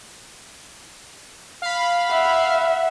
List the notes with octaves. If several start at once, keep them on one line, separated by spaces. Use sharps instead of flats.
F5 B5
E5 F#5